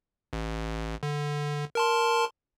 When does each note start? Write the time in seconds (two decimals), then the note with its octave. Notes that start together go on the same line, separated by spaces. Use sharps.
0.33 A1
1.03 D3
1.75 A#4 A5 C6